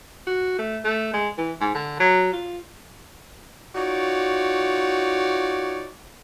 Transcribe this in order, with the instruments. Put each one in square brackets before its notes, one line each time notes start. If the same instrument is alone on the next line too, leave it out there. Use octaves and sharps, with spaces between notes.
[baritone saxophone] F#4
A3
A3
G#3
E3
G#2
D3
F#3
F4
[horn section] D#4 F4 F#4 C#5 D5